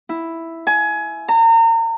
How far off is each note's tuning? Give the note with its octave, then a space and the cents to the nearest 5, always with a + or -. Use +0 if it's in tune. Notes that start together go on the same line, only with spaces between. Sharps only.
E4 +0
G#5 +25
A#5 -35